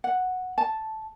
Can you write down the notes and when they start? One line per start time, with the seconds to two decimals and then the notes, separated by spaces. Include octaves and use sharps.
0.04 F#5
0.58 A5